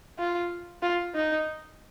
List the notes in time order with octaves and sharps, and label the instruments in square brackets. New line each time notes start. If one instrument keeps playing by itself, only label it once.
[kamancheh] F4
F4
D#4